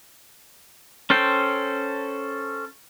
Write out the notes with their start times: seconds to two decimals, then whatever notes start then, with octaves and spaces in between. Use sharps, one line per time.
1.10 C#4 A4 C5 G5